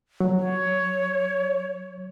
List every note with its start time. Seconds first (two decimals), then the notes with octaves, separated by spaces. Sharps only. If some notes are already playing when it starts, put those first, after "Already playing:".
0.20 F#3
0.40 C#5